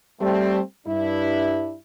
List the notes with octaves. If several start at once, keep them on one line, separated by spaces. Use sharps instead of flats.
G3 A3 C4
G2 D4 E4